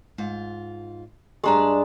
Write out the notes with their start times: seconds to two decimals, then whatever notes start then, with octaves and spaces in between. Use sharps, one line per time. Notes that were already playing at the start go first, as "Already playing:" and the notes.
0.18 G#2 F4
1.44 G2 G#3 D4 G4 D5 A#5